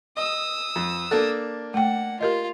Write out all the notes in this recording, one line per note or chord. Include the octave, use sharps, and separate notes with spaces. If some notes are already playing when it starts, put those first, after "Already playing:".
D#5 D#6 E6
F2
A#3 D4 A4 A5
A3 F#5 G5
F4 G4 A#4 D#5